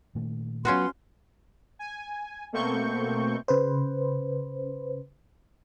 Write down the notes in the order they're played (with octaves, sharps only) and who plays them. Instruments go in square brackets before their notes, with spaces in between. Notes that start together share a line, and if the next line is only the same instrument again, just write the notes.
[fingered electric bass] A#2 D#3 A3
[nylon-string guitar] F#3 B3 [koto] C#4 F4 F#4 [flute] C6
[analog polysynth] G#5
B2 A3 A#3 C4 C#6 G6
[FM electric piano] C#3 B4 C5